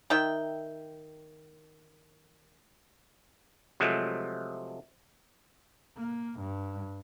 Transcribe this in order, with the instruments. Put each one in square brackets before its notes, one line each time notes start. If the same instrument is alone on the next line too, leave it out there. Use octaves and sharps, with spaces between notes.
[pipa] D#3 E5 G5
[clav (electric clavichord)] C3 F3 F#3 G#3 A3
[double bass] A#3
G2